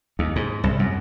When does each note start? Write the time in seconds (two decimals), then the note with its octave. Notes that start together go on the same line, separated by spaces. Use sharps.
0.19 D#2
0.36 G#2
0.64 C2
0.79 F#2